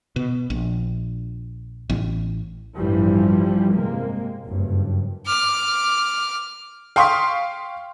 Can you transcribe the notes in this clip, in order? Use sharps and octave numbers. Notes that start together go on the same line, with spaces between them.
B2
A#1
A1
A1 G2 E3 F3 G3
C3 G#3 A#3
F#1 G2
D6 F6
F5 G5 C6 C#6 D#6 B6